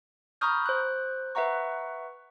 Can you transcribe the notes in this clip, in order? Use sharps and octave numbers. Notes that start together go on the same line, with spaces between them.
A#5 B5 C#6 D#6 F6 G6
C5 F#6
B4 E5 F#5 A#5 C#6